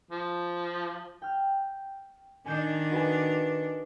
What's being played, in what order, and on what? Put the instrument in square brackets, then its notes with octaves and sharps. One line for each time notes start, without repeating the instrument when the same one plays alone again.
[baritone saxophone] F3
[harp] G5 F6
[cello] D#3 D4 [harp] G#5 G6 C7
[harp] F#4 B4 G#5